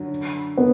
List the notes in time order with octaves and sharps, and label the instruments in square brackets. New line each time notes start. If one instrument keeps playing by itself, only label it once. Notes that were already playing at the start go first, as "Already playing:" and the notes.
Already playing: [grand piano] F#2 D3 F#3
[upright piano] B3